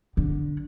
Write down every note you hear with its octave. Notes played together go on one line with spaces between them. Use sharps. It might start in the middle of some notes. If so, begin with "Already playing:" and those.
D3